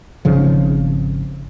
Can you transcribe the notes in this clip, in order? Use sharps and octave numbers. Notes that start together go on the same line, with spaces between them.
G#1 G#2 C#3 F3